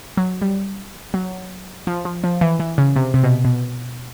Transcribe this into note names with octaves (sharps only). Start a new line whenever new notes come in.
F#3
G3
F#3
F3
F3
F3
E3
E3
C#3
C3
C3
B2
B2